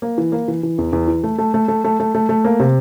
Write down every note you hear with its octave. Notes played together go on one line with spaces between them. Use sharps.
A#3
E3
A#3
E3
E3
E2
E2
E3
A3
A3
A3
A3
A3
A3
A3
A3
A#3
C3